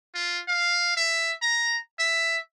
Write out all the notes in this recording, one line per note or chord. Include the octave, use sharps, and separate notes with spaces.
F4
F5
E5
A#5
E5